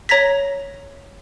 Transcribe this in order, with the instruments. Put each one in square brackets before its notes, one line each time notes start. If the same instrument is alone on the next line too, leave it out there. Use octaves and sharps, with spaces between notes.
[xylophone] C#5 A#5 G#6 A#6 B6